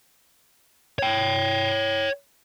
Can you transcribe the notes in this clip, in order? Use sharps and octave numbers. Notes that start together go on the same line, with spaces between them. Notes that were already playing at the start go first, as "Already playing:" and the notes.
C#5 G5